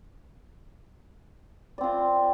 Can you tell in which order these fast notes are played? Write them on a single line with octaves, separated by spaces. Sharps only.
D5 C4 F4